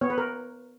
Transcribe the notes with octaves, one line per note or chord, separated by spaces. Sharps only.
B3 C#5
B4
A#4